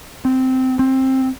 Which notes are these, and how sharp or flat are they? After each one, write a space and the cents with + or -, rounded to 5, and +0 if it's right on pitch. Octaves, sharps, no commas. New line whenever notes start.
C4 -10
C4 +15